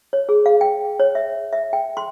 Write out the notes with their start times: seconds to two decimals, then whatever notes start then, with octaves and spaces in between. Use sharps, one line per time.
0.13 C#5
0.29 G#4
0.46 F5
0.61 G5
1.00 C#5
1.15 E5
1.53 E5
1.73 G5
1.97 C6